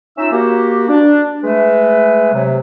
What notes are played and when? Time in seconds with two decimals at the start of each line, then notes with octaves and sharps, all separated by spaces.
0.17 C#4 D#4 F4 E5 E6
0.31 A#3 F#4 G4
0.89 D4
1.44 G#3 A3 B4
2.33 C3 F#3